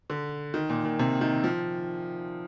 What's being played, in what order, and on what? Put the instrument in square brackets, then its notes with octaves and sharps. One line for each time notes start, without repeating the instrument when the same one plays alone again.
[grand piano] D3
D#3
A#2
A#2
C3
D#3
F3